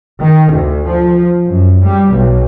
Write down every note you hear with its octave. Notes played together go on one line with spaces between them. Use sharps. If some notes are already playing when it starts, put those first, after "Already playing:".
D#3
D2
F3
F#2
G3
B1